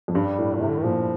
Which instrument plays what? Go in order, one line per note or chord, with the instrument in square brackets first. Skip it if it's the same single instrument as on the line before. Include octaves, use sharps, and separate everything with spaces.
[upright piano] F2
[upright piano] G2 [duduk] G3
[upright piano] A2
[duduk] A#2
[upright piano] A2 [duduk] C3
[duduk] D3
D#3
[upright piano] A#2 [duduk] F3